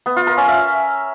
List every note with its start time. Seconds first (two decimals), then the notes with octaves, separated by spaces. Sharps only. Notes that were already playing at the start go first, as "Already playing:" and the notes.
0.06 B3
0.16 F4
0.27 A#4
0.37 C#4
0.48 E5